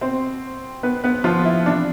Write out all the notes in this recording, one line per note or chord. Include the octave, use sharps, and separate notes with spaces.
B2 C4 C5
B2 B3 B4
B3 B4
F3 F4
E4
C3 E3 D4